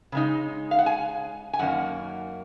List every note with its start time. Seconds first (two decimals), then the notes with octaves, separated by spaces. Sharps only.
0.12 C#3 G#3 D#4
0.71 F5
0.79 F#5
0.86 G#5
1.53 G#5
1.59 F#2 D#3 A#3 F#5